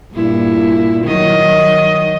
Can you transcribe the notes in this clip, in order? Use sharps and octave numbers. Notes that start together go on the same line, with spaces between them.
G2 A#2 E4
D#3 F#3 D#5